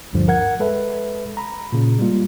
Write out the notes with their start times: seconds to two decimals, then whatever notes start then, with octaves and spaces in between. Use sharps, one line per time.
0.13 G1 D2 G2 D3 F3
0.28 A#4 F#5 G#6
0.60 G#3 A4 B4 E5
1.37 A#5 B5
1.72 A#2 C#3
1.99 G3 G#3 A#3 F4